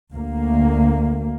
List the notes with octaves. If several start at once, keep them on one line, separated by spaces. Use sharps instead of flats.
D2 A#3